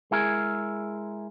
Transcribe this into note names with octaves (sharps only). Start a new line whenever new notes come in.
G#3 E4 G#4 A#4